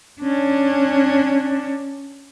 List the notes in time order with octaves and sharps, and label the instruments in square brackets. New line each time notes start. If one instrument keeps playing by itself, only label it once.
[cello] C#4 D4